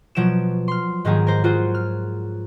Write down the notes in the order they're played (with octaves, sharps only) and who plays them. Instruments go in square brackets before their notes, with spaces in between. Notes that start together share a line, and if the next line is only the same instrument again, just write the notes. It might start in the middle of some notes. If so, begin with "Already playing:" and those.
[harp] B2 F3 F#3 D7 E7
C6 F6
G#2 D#3 F#3 A#3 G4 G#4
A#4 C5
F4 F#4 G#4 C5
F6